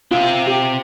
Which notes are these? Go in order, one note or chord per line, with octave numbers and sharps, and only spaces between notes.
C4 F4 E5
G4